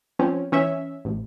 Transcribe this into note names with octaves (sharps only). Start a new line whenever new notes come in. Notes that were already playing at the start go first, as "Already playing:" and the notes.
F3 C4 C#4
E3 C#4 E5
A1